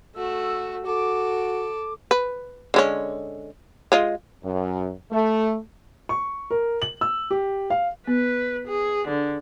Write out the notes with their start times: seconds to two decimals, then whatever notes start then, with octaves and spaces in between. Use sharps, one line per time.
0.14 A3 F#4 E6
0.85 F#4 A4 D6
2.11 B4
2.74 D3 G#3 C#4
3.92 G#3 F4 D#5
4.44 F#2
5.11 A3
6.09 C#6
6.51 A#4
6.82 F#7
7.01 E6
7.31 G4
7.70 F5
8.07 B3 B4
8.67 G#4
9.08 D3 D4